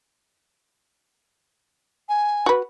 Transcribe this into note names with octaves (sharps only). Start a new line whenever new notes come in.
G#5
F#4 B4